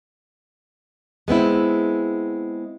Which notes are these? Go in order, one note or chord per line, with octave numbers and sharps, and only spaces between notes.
G#3 B3 C4 E4